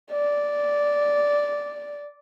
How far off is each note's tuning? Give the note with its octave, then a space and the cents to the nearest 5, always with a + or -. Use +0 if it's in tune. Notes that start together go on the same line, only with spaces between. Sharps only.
D5 -10